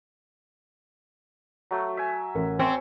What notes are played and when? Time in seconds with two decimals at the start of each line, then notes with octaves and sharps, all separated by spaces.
1.71 F#3 A3
1.97 E5 G#5
2.35 A1 A#4
2.59 C4 C#5 E5 G#5